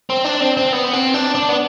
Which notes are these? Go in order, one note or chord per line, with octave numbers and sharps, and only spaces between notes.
C4
D4
C4
C4
B3
C4
D4
D4
B3